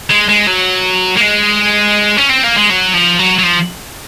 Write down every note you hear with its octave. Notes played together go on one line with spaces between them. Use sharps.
G#3
G#3
F#3
A#3
G#3
C#4
C4
A#3
G#3
F#3
F3
F#3
F#3
F3